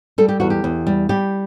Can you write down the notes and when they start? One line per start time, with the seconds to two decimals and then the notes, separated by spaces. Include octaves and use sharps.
0.18 G3 A4
0.28 G4
0.40 E2 F#4
0.50 G4
0.64 E2
0.87 G3
1.09 G3 G4